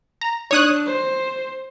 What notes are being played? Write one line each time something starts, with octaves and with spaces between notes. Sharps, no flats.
A#5
D4 C#5 D#6 F#6
C5